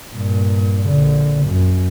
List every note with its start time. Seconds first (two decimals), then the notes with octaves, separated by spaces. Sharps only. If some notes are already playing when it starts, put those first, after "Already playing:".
0.14 G2 A#2
0.88 A#1 D3
1.47 F#2